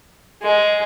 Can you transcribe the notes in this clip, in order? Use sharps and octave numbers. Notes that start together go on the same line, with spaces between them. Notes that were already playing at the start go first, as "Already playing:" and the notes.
G#3